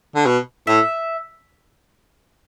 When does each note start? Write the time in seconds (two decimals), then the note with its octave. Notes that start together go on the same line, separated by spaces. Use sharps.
0.15 D3
0.26 B2
0.67 A2 E5